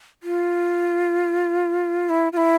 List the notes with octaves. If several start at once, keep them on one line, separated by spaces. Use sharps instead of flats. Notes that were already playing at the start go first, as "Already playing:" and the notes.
F4
E4
F4
E4